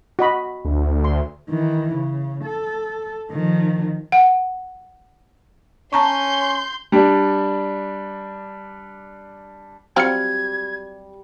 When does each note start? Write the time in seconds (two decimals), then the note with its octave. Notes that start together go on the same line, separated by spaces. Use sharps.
0.19 F#4 D#5 B5
0.65 D2
1.04 C6
1.50 D#3 E3
1.95 C#3
2.44 A4
3.31 D#3 F3
4.12 F#5
5.93 C#4 A5 A#5 C6 C#6 G6
6.92 G3 D4
9.96 F#3 G3 C4 F4 G5 F6 G#6 C#7